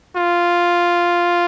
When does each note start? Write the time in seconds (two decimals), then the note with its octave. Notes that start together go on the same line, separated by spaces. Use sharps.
0.16 F4